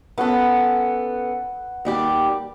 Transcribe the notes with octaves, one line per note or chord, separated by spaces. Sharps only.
B3 C#4 A4 B4 F#5 C#6
D#2 G3 G4